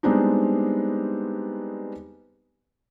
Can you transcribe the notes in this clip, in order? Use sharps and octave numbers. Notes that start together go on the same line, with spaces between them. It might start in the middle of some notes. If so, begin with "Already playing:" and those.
G3 G#3 B3 C4 D4 D#4